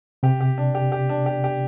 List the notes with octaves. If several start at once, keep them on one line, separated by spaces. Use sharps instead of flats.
C3 G4
G4
D4
G4
G4
D4
G4
G4